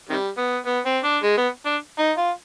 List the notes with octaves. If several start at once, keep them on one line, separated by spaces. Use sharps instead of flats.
C3 D#3 G3
B3
B3
C4
D4
G#3
B3
D4
D#4
F4